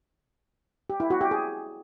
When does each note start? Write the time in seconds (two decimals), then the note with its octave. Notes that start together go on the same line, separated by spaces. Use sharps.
0.90 G4
1.00 E4
1.10 F#4
1.21 G4
1.31 G#4